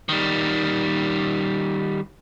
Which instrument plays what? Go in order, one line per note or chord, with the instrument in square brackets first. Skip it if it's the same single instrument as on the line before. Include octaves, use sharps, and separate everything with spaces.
[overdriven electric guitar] D#3 G3